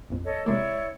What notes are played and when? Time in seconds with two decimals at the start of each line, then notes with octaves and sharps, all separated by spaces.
0.10 A#1 F2
0.24 A4 C#5 D#5
0.46 C3 G#3 A#3 E4 C#5 D5